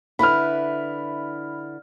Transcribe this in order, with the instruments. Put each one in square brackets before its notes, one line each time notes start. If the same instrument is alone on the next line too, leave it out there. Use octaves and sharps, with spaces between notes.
[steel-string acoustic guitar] D3 E4 B4 [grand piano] B5 F6